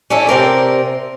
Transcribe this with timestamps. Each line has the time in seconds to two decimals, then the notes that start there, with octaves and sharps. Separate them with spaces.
0.10 C#4 D4 E4 A4
0.27 C3 C4 A#4 D5